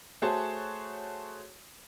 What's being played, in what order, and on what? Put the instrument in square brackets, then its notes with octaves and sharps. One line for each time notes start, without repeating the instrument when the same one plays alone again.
[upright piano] A3 F#4 G#4 C5 C#5 A5